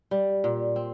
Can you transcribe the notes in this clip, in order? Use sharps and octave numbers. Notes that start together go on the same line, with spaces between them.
G3
A#2
C4